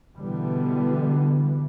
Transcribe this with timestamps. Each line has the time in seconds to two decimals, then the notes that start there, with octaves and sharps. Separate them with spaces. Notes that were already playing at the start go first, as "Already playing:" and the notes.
0.17 B2 D3 E3 G3 B3